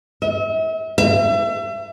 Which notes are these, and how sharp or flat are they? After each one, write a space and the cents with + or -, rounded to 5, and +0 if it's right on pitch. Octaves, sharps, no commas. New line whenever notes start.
E5 -40
E5 +35